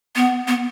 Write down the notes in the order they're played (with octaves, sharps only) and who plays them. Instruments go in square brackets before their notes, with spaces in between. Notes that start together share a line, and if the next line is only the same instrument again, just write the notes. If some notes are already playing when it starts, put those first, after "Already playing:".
[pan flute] B3
B3